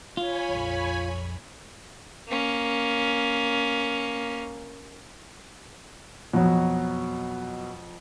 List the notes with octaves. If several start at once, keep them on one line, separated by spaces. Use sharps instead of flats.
F4 C#5 G#5 B5
A#1 F2
A#3 C#4
F2 B2 F#3